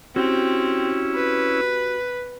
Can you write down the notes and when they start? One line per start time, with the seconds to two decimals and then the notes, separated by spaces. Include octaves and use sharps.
0.16 C4 C#4 E4 F#4 G4
1.15 B4